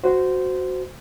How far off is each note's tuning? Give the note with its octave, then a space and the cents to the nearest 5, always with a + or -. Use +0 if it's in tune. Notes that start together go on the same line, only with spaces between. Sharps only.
F#4 +0 C5 -15